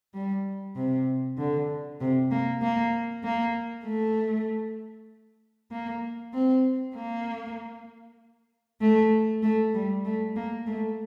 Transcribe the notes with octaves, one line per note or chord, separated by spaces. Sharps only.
G3
C3
D3
C3
A#3
A#3
A#3
A3
A#3
C4
A#3
A3
A3
G3
A3
A#3
A3